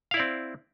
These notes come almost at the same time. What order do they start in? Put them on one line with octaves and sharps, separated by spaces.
F5 E4 D5 C4